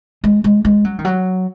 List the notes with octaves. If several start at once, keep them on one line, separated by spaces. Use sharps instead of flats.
G#3
G#3
G#3
F#3
D#3
F#3